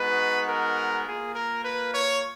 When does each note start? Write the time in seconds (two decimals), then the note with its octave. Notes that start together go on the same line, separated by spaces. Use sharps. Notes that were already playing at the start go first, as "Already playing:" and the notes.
Already playing: G#3 B3 D#4 F#4 B4
0.49 A#4
1.07 A#3 F4 G#4
1.36 A#4
1.65 B4
1.95 C#5